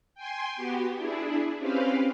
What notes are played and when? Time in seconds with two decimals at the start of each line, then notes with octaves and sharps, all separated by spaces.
0.15 G5 G#5 C6
0.56 B3 F#4 G4
0.96 D4 E4 G#4
1.58 C4 C#4 G4 B4 F5